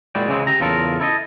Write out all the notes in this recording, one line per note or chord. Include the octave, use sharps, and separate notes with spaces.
A#2 G#3 E4 F#4 D5 G5
C#3 E3 G#3 C4
G4 A#5
E2 C#3 F4 A4 A#4
E4 A4 D5 D#5